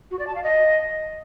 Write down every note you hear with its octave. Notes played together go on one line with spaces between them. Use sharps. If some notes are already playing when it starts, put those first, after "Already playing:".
F#4
D5
A5
F5
D#5